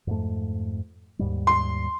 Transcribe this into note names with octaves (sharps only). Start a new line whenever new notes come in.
F2 G#2 A3
D#2 G#2 G3
C6